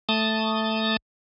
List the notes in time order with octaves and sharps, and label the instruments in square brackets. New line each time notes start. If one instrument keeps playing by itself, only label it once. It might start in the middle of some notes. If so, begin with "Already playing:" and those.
[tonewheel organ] A3 A5 D#6